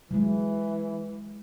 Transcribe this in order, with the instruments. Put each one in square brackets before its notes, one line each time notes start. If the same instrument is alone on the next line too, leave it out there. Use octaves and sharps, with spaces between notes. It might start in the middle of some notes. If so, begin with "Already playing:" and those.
[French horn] E3 [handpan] F#3 G#3